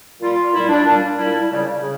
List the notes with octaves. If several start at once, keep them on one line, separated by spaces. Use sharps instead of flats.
A#2 G3 F4
A#2 G3 E4
D4
A#2 G3 D4
A#2 G3 E4
C#3 G3
C#3